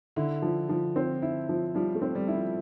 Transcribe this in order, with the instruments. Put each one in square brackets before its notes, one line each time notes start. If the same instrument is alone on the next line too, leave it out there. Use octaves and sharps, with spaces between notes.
[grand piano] D3 [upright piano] E4
[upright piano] F3
F3
C4
E4
F3
[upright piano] F3 [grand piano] G3
[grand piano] A3
[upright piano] C4
[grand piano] G3
[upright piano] E4
[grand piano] F3